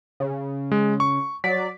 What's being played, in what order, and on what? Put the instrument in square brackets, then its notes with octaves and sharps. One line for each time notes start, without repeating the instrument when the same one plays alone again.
[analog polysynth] C#3
[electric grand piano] G#3
C#6
[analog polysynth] F#3 D5 [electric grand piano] B6